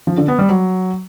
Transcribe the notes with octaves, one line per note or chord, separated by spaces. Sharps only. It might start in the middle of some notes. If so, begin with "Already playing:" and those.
F3
D3
B3
G3
F#3